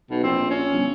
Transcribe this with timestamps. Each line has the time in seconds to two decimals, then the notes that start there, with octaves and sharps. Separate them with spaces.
0.10 B1 B2
0.23 A#1 C4
0.50 C#4
0.73 G1